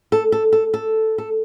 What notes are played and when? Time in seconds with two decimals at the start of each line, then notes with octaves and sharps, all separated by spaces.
0.12 A4
0.32 A4
0.52 A4
0.74 A4
1.18 A4